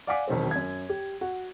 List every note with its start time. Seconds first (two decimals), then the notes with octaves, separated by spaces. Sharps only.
0.07 D5 F5 F#5 G#5 D6 B6
0.27 E1 D#3 F#3 C4
0.51 F#2 G#6
0.89 G4
1.21 F#4